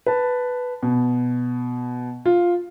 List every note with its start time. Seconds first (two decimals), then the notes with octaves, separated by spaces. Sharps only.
0.06 B4 A5
0.83 B2
2.26 F4